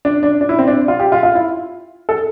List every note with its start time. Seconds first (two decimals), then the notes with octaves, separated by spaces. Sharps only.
0.05 D4
0.23 D4
0.41 D4
0.49 E4
0.59 C4
0.68 D4
0.88 F4
1.00 G4
1.12 F4
1.23 F4
1.35 E4
2.09 A4